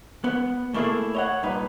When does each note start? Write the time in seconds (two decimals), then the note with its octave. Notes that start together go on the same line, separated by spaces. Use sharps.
0.24 B3
0.74 A3 A#3 E4 F#4 G#4 A4
1.15 C#5 D#5 F#5
1.43 G2 A#2 D#4 B4